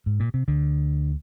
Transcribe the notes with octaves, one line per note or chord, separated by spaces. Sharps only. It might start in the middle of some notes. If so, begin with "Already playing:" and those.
G#2
A#2
C3
D2 D3